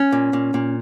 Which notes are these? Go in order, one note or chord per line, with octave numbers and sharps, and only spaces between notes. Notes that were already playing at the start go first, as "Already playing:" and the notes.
Already playing: C#4
A#2
A#2
A#2